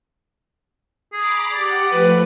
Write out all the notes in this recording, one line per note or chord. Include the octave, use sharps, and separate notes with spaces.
G#4 A#5 B5 D6
G4 D5 F#5
F3 A3 B4